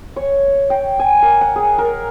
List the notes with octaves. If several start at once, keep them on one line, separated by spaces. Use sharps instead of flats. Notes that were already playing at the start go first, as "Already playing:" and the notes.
C#5
G5
G#5
A#4
F#5
G#4
A#4